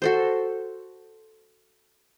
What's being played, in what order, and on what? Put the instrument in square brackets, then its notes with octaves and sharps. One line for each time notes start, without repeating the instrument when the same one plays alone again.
[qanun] F#4 A4 C5